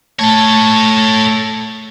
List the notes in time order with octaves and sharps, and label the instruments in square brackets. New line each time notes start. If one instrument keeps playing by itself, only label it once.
[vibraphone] A3 A5 [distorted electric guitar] A4 C#5